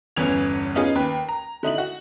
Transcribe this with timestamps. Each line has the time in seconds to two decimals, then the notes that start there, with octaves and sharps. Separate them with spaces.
0.16 G1 E2 B3 C#4 G#6 F7
0.75 B3 C#4 D#4 F4 G#4
0.95 D#2 B4
1.29 A#5
1.63 D3 D#4 E4 F#7
1.78 F#4